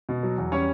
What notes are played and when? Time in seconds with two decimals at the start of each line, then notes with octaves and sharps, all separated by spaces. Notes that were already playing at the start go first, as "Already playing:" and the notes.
0.09 B2
0.23 F#3
0.38 E2
0.52 G3 C#4 C#5